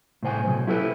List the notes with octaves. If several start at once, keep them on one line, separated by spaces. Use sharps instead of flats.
A2 C3 C5 G5 G#5
B2 F#3
E4 G4 A4 B4